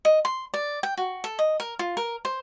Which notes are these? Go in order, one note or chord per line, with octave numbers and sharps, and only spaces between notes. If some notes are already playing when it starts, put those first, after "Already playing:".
D#5
C6
D5
G5
F#4
A4
D#5
A#4
F4
A#4
C5